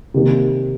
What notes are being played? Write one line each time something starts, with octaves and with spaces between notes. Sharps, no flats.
C3 D#3 A#3